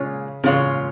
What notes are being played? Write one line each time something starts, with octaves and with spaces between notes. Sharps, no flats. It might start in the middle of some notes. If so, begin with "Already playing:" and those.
Already playing: A#2 C#3 G#3 C#4 F4 C#5
A#2 C#3 G#3 C#4 F4 C#5